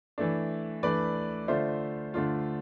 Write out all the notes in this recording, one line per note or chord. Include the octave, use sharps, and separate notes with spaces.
E3 A3 D4
E3 A3 D4 B4 D5
D3 A3 D4 F4 C5 E5
D3 A3 D4 F4